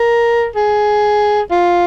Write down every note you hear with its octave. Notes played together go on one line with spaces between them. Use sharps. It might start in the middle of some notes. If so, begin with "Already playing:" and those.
Already playing: A#4
G#4
F4